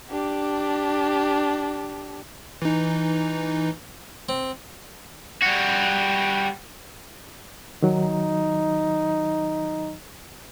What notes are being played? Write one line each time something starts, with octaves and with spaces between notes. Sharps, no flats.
D4 G4
E3 D#4
C4
G3 F#4
D#3 F#3 D#4